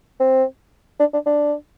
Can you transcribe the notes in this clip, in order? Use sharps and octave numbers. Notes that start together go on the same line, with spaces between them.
C4
D4
D4
D4